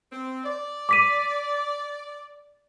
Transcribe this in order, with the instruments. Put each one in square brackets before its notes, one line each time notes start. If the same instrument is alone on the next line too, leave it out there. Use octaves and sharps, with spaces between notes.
[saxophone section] C4
D5
[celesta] D6 B6 D#7